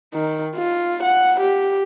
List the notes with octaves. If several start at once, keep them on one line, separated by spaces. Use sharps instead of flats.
D#3
F4
F#5
G4